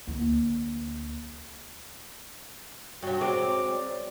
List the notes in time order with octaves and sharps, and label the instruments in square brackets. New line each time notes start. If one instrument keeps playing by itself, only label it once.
[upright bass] D2 A#3
[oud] G2 F#3 [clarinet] F#4
[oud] F#3 G#3 C4 [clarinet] D6
[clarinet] D5